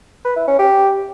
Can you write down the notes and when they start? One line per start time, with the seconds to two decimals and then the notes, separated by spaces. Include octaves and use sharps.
0.24 B4
0.36 E4
0.47 C#4
0.59 G4